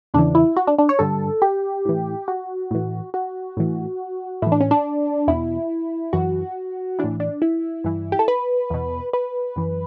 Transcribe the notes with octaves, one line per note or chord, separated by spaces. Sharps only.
E2 C#3 E3 D4
E4
F#4
D4
D4
C#5
G2 D3 A4
G4
A2 E3
F#4
A2 E3
F#4
A2 E3
A2 E3 E4
D4
C#4
D4
E2 B2 E4
F#2 E3 F#4
A2 E3 D4
D4
E4
G2 E3
G4
A4
B4
E2 B2
B4
F#2 E3